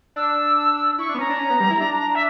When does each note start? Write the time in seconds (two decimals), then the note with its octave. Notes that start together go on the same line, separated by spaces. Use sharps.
0.16 D4 E6
0.98 E4 C#6
1.09 D4
1.15 B3
1.19 C#4 A#5
1.30 D4
1.39 C#4
1.50 B3
1.60 G3
1.71 E4
1.81 D4
2.15 E5